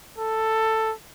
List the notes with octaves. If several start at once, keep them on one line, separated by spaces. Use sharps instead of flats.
A4